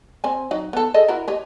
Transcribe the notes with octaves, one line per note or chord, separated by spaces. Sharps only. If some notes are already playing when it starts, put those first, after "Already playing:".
C4 G#5
F#3 D#4 D#5
B3 A4
G#4 A4 D#5
E4 F#4 A#4
G4 C#5 D#5